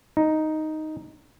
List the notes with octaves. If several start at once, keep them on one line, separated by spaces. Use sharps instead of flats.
D#4